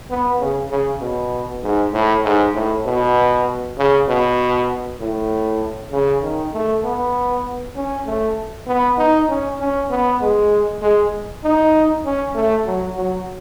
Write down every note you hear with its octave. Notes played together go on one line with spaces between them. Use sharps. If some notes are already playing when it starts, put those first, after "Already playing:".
B3
C#3
C#3
B2
G#2
A2
G#2
A2
B2
C#3
B2
A2
C#3
D#3
A3
B3
C#4
A3
B3
D#4
C#4
C#4
B3
G#3
G#3
D#4
C#4
A3
F#3
F#3